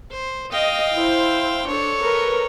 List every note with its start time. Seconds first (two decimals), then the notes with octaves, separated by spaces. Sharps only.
0.11 C5
0.52 D#5 F5 G5
0.94 E4 C5
1.67 D4 A4 C#5
1.99 A#4 B4